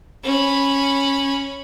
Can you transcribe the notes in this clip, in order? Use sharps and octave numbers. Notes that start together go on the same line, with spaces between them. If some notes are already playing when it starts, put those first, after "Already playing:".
C#4 B5